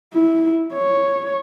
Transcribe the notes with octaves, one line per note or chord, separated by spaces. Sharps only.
E4
C#5